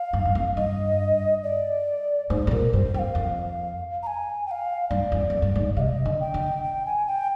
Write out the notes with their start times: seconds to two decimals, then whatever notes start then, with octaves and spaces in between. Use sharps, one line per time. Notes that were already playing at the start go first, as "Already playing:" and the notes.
Already playing: F5
0.13 G2
0.25 G2
0.35 F2
0.56 G2 D#5
1.43 D5
2.30 G#2 C5
2.47 G#2
2.51 A#2 A#4
2.73 G2 C5
2.94 F2 G5
2.99 F5
3.15 F2
4.03 A#5
4.07 G#5
4.46 G5
4.51 F5
4.90 G2 D5
5.12 F2
5.30 F2
5.42 G2
5.56 G#2
5.77 C3 F5
5.80 D#5
6.06 D3
6.20 G5
6.34 D3
6.64 G5
6.86 G#5
7.07 G5